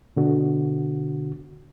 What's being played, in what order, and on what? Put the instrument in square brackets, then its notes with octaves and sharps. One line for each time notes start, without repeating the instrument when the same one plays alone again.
[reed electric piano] B2 D3 F#4